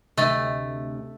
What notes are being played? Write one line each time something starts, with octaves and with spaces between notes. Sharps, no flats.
D2 C3 A3 D#5